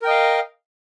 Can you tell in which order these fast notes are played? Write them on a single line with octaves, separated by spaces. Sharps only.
A#4 G5 D#5 F5